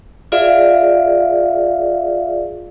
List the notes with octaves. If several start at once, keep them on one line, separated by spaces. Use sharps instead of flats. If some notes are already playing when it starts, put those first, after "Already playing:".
F4 G#4 D5 E5 F5